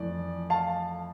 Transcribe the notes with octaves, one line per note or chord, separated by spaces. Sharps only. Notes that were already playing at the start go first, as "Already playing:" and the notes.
Already playing: F2 E3 A3 D5
F5 A5